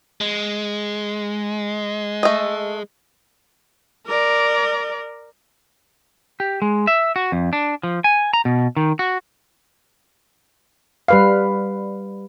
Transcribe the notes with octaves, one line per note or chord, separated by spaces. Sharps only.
G#3
A3 D#5
A#4 D5
G4
G#3
E5
F#4
F2
D4
F3
G#5
A#5
B2
D#3
F#4
G3 B4 F5